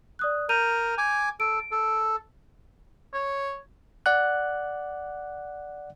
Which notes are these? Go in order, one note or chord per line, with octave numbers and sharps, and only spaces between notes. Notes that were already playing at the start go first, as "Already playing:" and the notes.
D5 D#6 F#6
A#4 G6 D#7 F7
G#5 D6
A4 D7
A4
C#5
D5 F#5 F#6